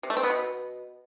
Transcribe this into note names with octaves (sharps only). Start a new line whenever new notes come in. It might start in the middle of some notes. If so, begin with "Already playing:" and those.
C3
A3
C4
B3
B2